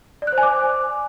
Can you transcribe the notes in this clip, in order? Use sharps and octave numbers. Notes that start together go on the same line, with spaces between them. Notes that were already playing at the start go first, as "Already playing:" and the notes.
D5
F#6
C5
G#5
D6